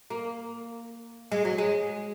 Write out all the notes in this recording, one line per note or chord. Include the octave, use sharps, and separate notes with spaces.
A#3
G#3
F#3
G#3